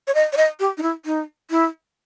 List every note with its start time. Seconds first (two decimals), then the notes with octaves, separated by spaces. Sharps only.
0.07 C#5
0.15 D#5
0.33 C#5
0.37 D#5
0.60 G4
0.77 D#4
0.82 E4
1.05 D#4
1.50 E4